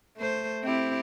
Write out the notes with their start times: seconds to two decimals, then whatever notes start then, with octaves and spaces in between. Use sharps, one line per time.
0.17 A3 C5
0.64 C4 E4 G4